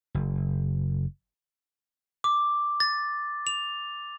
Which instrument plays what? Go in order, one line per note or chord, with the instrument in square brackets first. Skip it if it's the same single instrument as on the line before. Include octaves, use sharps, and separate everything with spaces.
[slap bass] F#1
[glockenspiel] D6
A6
F7